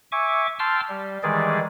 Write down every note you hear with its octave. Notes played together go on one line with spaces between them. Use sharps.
E5 G#5 C#6 D6
G5 A5 C6 D6 E6 F6
G3
D#3 E3 G3 G#3 G#4 D5